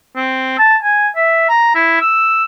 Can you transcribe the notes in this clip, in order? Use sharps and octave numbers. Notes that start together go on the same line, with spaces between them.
C4
A5
G#5
E5
A#5
E4
E6